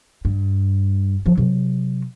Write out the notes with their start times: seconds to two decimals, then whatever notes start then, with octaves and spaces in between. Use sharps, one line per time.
0.25 G2
1.26 F3 F#3
1.38 C3 F#3